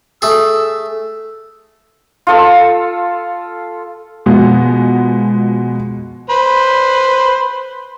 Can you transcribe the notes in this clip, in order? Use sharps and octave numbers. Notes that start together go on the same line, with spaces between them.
A3 G#4 E6
F4 A4 E6
B2 F3 G#3 B3
B4 C5 B5